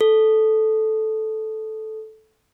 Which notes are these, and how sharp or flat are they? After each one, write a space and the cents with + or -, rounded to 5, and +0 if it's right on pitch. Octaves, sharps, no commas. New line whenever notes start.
A4 -10